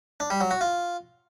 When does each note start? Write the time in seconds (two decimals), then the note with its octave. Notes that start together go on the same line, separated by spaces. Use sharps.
0.20 D4
0.30 G3
0.41 F#3
0.51 F#4
0.61 F4